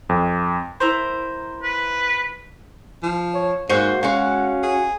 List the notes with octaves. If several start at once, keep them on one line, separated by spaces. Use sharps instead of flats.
F2
E4 A#4 C5
B4
F3
C#5
G#2 A#3 F#4 C5
G#3 C#4 F#4 F5 F#5
G#4